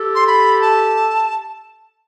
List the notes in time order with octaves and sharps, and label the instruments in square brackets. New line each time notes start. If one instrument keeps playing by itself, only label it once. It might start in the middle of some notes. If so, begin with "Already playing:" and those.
Already playing: [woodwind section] G4 A4
[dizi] C6
B5
A5